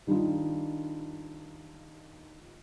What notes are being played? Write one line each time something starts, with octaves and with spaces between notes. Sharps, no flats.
D#3 G3 D4 D#4 F4